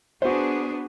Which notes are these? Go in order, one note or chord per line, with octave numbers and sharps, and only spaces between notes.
B3 D4 F#4 G#4 C5